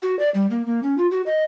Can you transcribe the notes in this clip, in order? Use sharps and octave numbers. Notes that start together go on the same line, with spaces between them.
F#4
D5
G3
A#3
A#3
C#4
F4
F#4
D#5